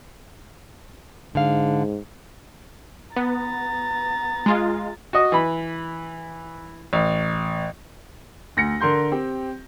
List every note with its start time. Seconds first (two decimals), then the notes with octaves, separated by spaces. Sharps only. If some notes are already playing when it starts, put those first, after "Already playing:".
1.35 G#2 D3 F5
3.16 B3 A#5 A6
4.46 G#3 F4
5.13 F#4 D#5
5.32 E3 B5
6.93 A1
8.57 D2 A#6 C#7
8.81 D3 A#4 C6 G6
9.12 C4 G4